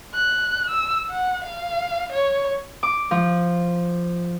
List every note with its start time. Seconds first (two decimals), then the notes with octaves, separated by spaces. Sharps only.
0.14 F#6
0.70 E6
1.11 F#5
1.44 F5
2.13 C#5
2.83 D6
3.11 F3